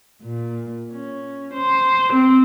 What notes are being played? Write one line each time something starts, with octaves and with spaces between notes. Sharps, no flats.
A#2
C#4
C5
C4